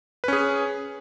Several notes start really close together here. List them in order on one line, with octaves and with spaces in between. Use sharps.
B4 C#4 G#4